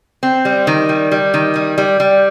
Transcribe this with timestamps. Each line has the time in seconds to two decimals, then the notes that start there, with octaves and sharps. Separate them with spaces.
0.23 C4
0.45 G3
0.67 D#3
0.89 G3
1.11 G3
1.34 D#3
1.56 G3
1.78 G3
2.00 G3